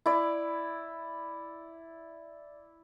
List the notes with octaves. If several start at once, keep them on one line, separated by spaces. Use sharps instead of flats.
E4 D5